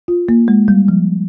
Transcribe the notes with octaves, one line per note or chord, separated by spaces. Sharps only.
F4
A#3
G#3
G3
F3